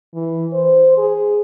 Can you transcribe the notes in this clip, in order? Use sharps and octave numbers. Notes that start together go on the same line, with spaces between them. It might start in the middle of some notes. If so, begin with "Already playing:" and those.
E3
C5
G#4